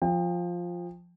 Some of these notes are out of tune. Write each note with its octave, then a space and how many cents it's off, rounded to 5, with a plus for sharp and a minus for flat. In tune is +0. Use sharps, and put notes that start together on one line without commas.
F3 +5 G5 +30